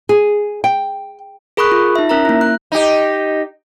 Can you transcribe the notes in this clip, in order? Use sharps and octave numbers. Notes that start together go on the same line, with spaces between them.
G#4
G5
G#4 A#4 B5 C#6 D#6 F#6
F4
D#4 E5
C#4 A#4 E5 A#5
A#3 E4
F#6
D#4 G4